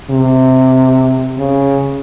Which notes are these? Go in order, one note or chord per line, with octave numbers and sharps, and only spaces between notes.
C3
C#3